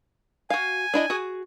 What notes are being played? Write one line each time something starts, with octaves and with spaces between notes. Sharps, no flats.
F#4 F5 G#5
D4 E4 D#5
F#4 G#4